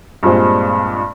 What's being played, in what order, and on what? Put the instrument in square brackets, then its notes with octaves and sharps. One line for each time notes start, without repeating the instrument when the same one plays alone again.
[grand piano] G2 A#2 G3 G#3 C4